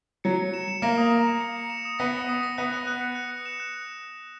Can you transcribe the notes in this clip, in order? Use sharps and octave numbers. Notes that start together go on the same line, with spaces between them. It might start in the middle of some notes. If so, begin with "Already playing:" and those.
F#3 C#7
C#7
E7
E7
A#3 A#6
D#6
E7
C#7
C#7
C#7
E7
D#6
B3 A#6
C#7
D#6
A#6
B3 F#6
F#6
F#6
C#7
F#6
C#7
E7
F#6